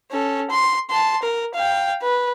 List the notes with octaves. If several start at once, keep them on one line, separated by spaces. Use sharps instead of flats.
C#4 A4
C6
A5 C6
A#4
F5 G5
B4